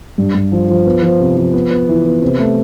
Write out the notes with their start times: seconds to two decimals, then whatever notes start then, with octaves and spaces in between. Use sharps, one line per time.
0.18 G2
0.34 G2
0.52 F3
0.69 F3
0.86 B3
1.02 F3
1.21 C3
1.37 F3
1.53 B3
1.71 B3
1.88 E3
2.06 B3
2.22 C3
2.39 A3